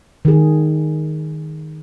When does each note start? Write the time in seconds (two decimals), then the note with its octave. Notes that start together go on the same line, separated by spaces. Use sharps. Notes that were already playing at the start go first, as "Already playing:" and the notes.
0.25 D#3 G#4